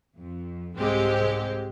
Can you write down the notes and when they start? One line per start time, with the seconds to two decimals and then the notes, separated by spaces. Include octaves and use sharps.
0.18 F2
0.75 C2 G#2 G#3 C4 G4